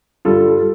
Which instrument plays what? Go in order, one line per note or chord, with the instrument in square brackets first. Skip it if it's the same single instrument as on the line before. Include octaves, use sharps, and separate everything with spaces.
[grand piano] G2 D3 G3 F4 A4